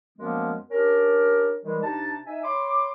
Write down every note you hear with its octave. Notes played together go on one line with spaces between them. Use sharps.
F#2 F3 G#3 A#3 B3 C#4
C#4 D4 G4 A#4
D#3 E3 G3 G#3
C3 D4 D#4 A5
D#4 E5 G#5
C#5 B5 C6 D6